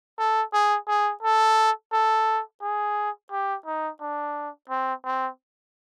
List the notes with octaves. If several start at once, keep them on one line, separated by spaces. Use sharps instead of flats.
A4
G#4
G#4
A4
A4
G#4
G4
D#4
D4
C4
C4